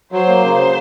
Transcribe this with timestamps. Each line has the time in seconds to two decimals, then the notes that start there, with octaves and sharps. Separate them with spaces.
0.12 F#3 C5
0.28 A#3
0.44 C#3